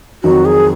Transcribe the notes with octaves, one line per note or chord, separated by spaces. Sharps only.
F2 D#3 F#3 F#4
G#4